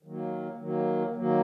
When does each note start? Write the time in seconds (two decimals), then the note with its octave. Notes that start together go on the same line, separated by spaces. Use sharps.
0.03 D#3 F#3 A#3
0.58 D#3 F#3 A#3
1.14 D#3 F#3 A#3